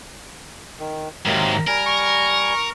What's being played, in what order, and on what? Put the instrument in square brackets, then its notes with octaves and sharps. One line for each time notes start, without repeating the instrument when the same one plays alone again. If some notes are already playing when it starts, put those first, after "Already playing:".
[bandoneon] D#3
[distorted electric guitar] G#2 D#3 [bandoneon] C3 F#3 A#3 [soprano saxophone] A#4
[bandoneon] G3 G#5 [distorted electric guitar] A#4
[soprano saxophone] C#6